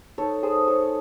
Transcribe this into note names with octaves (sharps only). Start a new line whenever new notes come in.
D#4 A4 C#5
G#4 C5
A3
A4 C#5